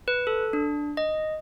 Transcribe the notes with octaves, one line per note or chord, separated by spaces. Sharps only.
B4
A4
D4
D#5